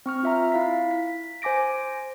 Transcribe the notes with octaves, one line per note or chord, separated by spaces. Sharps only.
C4 C#6 F6
F4 E5 A#5
E4 F5 B6
B6
C5 G#5 D6 A#6 D7